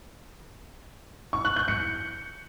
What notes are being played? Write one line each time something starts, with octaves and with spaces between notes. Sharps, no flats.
C#6
F#6
G6
C#7